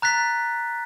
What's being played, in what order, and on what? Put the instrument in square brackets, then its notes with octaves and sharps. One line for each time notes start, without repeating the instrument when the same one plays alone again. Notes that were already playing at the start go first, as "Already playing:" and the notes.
[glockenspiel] A#5 F#6 A6 B6